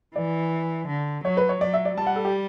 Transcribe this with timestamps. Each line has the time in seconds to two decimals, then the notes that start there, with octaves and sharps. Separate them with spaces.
0.15 E3 D5
0.88 D3
1.24 F#3 C#5
1.37 B4
1.49 C#5
1.61 F#3 D5
1.73 E5
1.85 D5
1.97 G3 A5
2.07 F#5
2.16 A4
2.25 G4